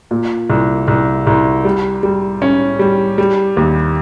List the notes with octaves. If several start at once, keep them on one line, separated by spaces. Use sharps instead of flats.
A#2
C2
C2
C2
G3
G3
C#4
G3
G3
D#2